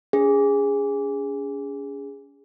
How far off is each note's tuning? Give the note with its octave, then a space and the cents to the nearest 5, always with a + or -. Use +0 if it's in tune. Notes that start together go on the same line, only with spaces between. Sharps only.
C#4 +40 G#4 -15